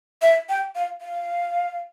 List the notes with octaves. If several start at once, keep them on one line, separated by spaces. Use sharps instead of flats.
E5
G5
F5
F5